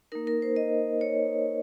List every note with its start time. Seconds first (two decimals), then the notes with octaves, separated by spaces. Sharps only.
0.12 A#3 D#4 A#4
0.27 A#4
0.42 C5
0.56 D#5
1.01 C#5